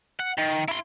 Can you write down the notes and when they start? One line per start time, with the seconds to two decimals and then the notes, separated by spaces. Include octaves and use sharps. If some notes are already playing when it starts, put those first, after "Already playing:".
0.20 F#5
0.38 D#3
0.68 E4 C6